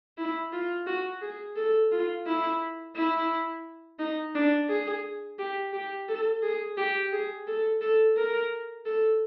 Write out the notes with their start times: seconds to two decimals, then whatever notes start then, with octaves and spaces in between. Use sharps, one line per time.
0.18 E4
0.53 F4
0.86 F#4
1.22 G#4
1.56 A4
1.92 F4
2.26 E4
2.96 E4
3.99 D#4
4.35 D4
4.69 G#4
5.39 G4
5.73 G4
6.09 A4
6.42 G#4
6.78 G4
7.13 G#4
7.47 A4
7.81 A4
8.17 A#4
8.85 A4